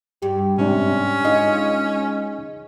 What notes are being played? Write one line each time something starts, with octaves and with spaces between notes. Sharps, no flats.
G2 G4
G#2 C3 C#4 D4
G#3 D#4 F4 D#5